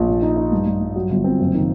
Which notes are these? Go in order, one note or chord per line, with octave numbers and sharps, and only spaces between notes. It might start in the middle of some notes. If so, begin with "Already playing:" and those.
Already playing: A#1
A#2
D#4
D#4
G2
G2
G2
F#3
G1
C4
F#1
D#3